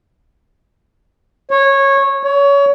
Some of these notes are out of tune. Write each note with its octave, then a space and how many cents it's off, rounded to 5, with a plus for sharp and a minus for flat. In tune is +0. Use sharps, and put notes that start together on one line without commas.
C#5 -15
C#5 +25